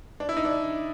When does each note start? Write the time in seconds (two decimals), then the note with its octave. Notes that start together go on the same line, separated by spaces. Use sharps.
0.20 D4
0.29 E4
0.37 D#4
0.45 D4